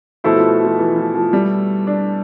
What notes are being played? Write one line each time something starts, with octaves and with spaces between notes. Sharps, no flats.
B2 F3 A3 E4 A4 C5
F3
F3
E3
F3
F3
G3
D4